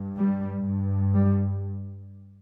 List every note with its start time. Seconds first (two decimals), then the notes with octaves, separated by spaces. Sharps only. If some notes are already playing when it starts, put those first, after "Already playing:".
Already playing: G2
0.15 G3
0.64 G2
1.14 G3